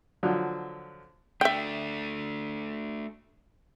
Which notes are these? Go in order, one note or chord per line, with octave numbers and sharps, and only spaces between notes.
D3 F3 F#3
A3 D4 E5 G5